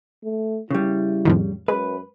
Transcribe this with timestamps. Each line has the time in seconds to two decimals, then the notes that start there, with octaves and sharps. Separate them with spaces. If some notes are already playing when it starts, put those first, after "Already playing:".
0.24 A3
0.70 C#3 G3 E4
1.25 F2 A2 D#3
1.68 F#2 G#3 B4